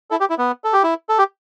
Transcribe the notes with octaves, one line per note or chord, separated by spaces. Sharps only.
E4 A4
G4
E4
B3
A4
G4
E4
A4
G4